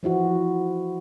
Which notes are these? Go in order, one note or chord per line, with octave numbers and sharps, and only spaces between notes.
E3 F3 E4 F#4